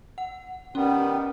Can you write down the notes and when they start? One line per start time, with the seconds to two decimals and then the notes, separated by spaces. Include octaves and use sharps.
0.18 F#5
0.75 D#3 G3 B3 C#4